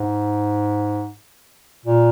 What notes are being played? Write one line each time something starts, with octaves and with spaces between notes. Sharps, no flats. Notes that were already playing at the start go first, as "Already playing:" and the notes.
Already playing: G#2
A#2